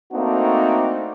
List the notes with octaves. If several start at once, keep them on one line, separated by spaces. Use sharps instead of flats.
A3 A#3 C4 D4 D#4 F#4